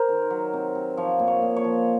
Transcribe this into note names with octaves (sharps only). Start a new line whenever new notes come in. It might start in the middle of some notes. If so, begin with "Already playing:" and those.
Already playing: A#4 C5
D#3
F#3
C3
C3
F3 C#5
A#2
C#5
A#2
C#5
F3